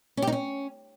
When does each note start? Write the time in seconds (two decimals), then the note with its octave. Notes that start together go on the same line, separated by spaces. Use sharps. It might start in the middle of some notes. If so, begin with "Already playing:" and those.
0.17 C#4
0.22 G4
0.27 D#4
0.32 C#4